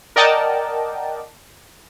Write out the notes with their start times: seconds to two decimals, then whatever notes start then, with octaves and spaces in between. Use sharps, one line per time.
0.16 A#4 D5 D#5 F#5 G5 A5